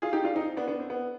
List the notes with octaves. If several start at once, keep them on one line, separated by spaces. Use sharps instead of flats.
F4 G#4
D#4 G4
D4 F4
C4 D#4
B3 D4
B3 D4
C4
B3